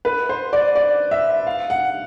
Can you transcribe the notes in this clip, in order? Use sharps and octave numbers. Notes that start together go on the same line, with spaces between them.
B4
C5
D5
D5
E5
F5
F#5